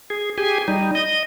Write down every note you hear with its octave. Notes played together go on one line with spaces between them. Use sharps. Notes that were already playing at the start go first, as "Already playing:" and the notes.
G#4
G4 G#4 G#5
G3 D#4
D#5